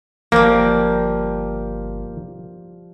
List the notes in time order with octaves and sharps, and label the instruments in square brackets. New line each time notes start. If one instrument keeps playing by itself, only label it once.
[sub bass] G1 [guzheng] F3 G3 [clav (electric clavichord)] A#3